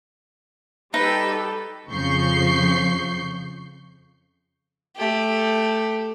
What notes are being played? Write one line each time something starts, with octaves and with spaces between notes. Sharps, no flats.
G3 D#4 G4 A4 B4
F2 C#3 F3 C#6 G6 C7
A3 G4